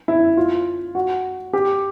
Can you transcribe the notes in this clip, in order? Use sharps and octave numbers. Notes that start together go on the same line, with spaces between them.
E4
F4
F#4
G4